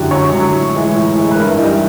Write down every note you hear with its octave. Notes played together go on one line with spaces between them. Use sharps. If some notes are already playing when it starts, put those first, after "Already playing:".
Already playing: F#2 D3 F#3 E4 F#4 G4
F#2 C#5
D3 F#3
A2
E3 G#3
A2
E3 G#3
B4
G2 A#4
E4
E3 G3 D#4